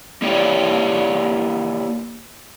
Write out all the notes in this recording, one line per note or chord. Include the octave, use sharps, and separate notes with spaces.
A#3 D4 E4 G4 C#5 D5